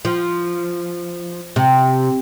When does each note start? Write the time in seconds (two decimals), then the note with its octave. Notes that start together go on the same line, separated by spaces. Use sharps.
0.05 F3
1.56 C3